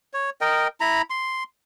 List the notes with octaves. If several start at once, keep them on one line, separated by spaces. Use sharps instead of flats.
C#5
A#4 D#5 G5
E4 A#5 B5
C6